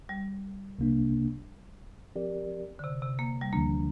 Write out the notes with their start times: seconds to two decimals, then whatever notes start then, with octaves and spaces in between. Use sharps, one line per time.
0.09 G3
0.78 C2 C3 A#3 D4
2.15 F3 C4 G4 A#4 D5
2.79 D3
2.84 C3
3.02 C3
3.19 A#3
3.41 G3
3.53 D2 D3 F3 A#3 D4